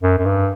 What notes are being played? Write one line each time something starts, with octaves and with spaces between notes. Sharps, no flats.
F#2
F#2
G2